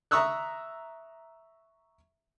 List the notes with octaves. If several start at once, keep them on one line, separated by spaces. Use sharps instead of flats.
E5 A#5 C#6 D#6 E6 F#6